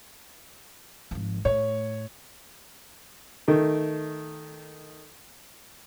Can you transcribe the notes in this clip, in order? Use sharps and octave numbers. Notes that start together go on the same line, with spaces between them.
G#1 F3
A2 C#5
D#3 A3